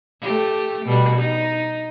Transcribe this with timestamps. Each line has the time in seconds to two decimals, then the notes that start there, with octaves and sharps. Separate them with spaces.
0.21 A3 G4
0.85 B2 G3
1.19 D#4